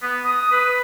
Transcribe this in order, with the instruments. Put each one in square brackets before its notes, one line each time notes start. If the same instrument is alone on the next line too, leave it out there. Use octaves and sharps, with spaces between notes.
[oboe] B3
D#6
B4